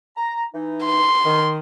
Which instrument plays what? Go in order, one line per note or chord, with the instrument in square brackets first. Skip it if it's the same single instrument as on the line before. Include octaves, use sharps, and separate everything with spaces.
[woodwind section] A#5
E3 D#4
[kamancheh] C6
[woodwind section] D#3